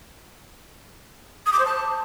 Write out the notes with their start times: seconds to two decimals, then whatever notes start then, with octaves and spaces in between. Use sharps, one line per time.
1.46 D#6
1.52 D6
1.59 C5
1.65 A5